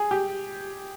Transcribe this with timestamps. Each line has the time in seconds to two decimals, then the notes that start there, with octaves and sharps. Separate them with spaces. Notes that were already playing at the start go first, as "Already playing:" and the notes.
Already playing: G#4
0.11 G4